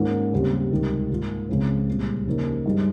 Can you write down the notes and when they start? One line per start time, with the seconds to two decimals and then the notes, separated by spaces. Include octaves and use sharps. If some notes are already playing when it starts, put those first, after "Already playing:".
Already playing: G#2 D#3 A#3 C#4 F4
0.33 D#2 C#3 G3 C4
0.71 C#2 C3 D#3 G3
1.10 G#2 D#3 A#3 F4
1.49 C#2 C#3 F3 G#3 C4
1.87 C2 A#2 G#3 C4
2.26 D#2 C#3 F3 A#3 D#4
2.65 G2 F3 G#3 D#4